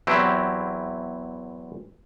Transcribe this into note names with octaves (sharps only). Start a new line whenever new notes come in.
E2 F#3 C4 E4 G4